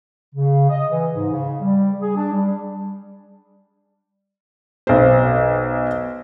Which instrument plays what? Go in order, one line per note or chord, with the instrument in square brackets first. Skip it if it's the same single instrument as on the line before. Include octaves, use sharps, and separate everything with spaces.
[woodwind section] C#3
D#5
E3
G#2
C#3
G3
G#4
D4
G3
[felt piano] B1 C5